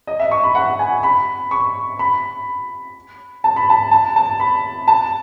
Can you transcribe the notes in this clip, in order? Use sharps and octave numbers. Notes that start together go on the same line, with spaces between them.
D#5
E5
C#6
B5
F#5
G#5
B5
C#6
B5
A5
B5
A5
A5
A5
B5
A5